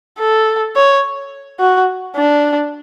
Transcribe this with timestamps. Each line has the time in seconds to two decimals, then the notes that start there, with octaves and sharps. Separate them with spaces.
0.19 A4
0.76 C#5
1.60 F#4
2.16 D4